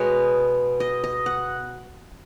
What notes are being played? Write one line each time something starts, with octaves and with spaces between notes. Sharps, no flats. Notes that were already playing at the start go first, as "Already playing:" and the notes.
Already playing: B2 G#3 B3 C#5
D#5
D#5
F#5